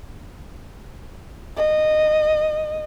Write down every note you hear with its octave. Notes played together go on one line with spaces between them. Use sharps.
D#5